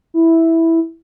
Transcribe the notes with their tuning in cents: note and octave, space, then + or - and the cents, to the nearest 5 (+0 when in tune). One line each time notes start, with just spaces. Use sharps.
E4 -5